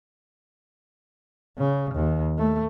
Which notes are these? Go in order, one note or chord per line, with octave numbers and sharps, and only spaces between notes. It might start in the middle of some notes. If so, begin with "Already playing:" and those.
C#3
D#2
A3